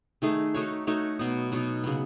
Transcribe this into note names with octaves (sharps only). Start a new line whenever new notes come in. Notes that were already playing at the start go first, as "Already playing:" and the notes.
D#3 A3 D#4 G#4
A3 D#4 F#4 C#5
A3 D#4 F#4 C#5
B2 F#3 B3 D#4
B2 F#3 B3 D#4
C#3 F#3 B3